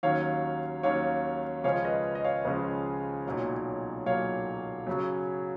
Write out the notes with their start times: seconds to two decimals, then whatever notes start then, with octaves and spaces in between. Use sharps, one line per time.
0.03 D#2 D#3 F#3 C#4 C#5 F5
0.83 D#2 D#3 F#3 C#4 C#5 F5
1.64 C#2 C#3 F3 G#3 C#4 C#5 F5
1.85 B4 D#5
2.15 D#5
2.24 C#5 F5
2.45 C#2 C#3 F3 G#3 C#4
3.26 B1 A#2 F#3 A#3
4.06 B1 A#2 F#3 A#3 C#5 F5
4.87 F#2 C#3 F#3